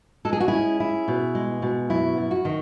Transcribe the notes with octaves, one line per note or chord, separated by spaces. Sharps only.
G#3 A4
G#4
F#4
E4 G#4
C#4
E4
B2
G#3
B2
F#2 E4
F#2
F#4
D#3